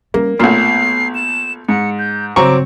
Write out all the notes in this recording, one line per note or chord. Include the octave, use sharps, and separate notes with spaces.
G3 A#3 C#4
B1 A#2 A3 B3 C7
E7
G#2 C#7
G6
G2 C#3 F#3 C4 A#5 C#6 D6